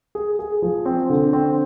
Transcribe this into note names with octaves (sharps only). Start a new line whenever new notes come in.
G#4
G#4
F3
C4
D3
C4